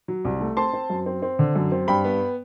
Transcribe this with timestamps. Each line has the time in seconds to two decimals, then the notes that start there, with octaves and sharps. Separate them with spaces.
0.08 F#3
0.25 C2
0.41 A3
0.57 C4 A5 C6
0.73 C4
0.90 F#2
1.06 C4
1.22 C4
1.39 D3
1.56 F#2
1.72 C4
1.88 G2 G5 B5
2.05 B3